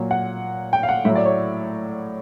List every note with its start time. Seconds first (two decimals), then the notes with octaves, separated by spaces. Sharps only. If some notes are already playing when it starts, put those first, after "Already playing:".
Already playing: A#2 F#3
0.11 F#5
0.73 G5
0.83 F5
0.89 F#5
1.05 A2 F#3 E5
1.15 D5
1.25 C#5